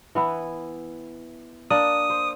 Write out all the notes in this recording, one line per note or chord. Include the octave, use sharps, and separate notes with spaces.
E3 B3 E4
A#3 D4 D5 D#6
C5